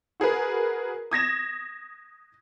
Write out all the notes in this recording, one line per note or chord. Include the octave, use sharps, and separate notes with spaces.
F#4 G#4 A#4 B4
D#6 G#6 A#6 E7